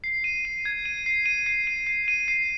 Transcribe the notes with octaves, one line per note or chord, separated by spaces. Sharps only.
C7
D#7
D#7
G#6
D#7
C7
D#7
C7
D#7
C7
D#7
C7